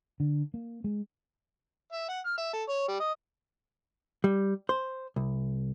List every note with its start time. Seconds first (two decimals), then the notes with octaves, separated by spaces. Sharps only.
0.20 D3
0.54 A#3
0.84 G#3
1.92 E5
2.09 F#5
2.26 F6
2.38 E5
2.53 A4
2.69 C#5
2.88 G3
3.00 D#5
4.24 G3
4.69 C5
5.16 C2